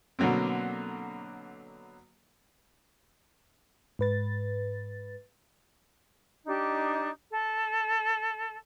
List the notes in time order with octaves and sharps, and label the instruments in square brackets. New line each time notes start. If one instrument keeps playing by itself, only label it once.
[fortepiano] B2 D3 F#3 A#3 C4
[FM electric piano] G#2 B4 A6
[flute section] D4 D#4 G4
A4